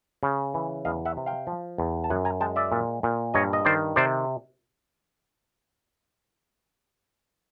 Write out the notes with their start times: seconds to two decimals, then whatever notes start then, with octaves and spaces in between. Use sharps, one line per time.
0.23 C#3
0.54 E3
0.85 E2 D#5 F5
1.05 E5 F#5
1.17 C3
1.26 F5 G5
1.47 F3
1.78 E2
2.04 A5
2.10 F#2 F#5 G#5
2.25 G#5 A#5
2.40 G#3 G5 A5
2.56 D5 E5
2.72 A#2
3.03 A#2
3.34 G2 C#5 D#5
3.53 D#5
3.65 D#3 C5 D5
3.96 C3 C5 D5